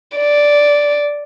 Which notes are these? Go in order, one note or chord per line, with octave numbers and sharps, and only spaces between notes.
D5